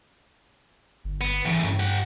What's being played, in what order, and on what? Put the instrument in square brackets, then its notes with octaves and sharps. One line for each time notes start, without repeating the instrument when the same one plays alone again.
[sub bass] G1
[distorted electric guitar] B3
[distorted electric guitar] A2 C#3 [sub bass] E3
[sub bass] G2
[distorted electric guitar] G4 F#5